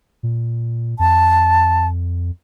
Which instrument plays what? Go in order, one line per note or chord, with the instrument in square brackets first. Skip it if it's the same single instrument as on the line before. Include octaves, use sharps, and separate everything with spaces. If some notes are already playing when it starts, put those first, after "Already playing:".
[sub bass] A#2
[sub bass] F2 [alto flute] A5